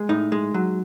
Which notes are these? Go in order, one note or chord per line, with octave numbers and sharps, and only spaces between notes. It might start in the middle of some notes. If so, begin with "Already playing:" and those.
Already playing: G#3
A2 D#4
G#3
F#3